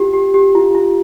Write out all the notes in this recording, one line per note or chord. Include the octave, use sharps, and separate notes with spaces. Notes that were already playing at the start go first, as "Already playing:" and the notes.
Already playing: F4 G4
G4
G4
F4
F4